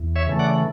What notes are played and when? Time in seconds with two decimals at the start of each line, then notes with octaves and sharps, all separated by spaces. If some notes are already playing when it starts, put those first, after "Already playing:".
Already playing: E2
0.16 C#5 E5
0.27 C#3 E3 A3
0.39 D5 F#5